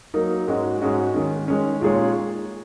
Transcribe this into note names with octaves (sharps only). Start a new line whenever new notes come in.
F#3 A#3 D#4 A#4
G#2 G#3 C#4 F#4 D#5
G#2 G#3 C#4 F#4 D#5
D#3 G#3 C#4
D#3 G#3 C#4
A#2 G#3 D#4 G#4 C#5